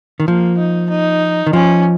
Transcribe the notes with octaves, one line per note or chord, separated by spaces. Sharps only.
D#3
F3 A#3
D#4
D#4
D#3
F3 C#4